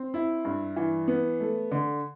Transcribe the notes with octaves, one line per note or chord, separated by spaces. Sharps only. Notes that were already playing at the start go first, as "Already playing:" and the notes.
Already playing: C4
E4
G2
E3
B3
A3
D3